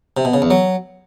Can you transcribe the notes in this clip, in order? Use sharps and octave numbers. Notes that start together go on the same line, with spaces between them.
C3
B2
C#3
E2
F#3